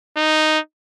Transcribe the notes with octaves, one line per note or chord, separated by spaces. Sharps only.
D#4